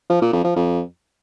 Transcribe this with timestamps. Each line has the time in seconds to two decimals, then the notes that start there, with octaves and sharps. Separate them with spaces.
0.10 F3
0.21 A#2
0.33 F2
0.44 F3
0.56 F2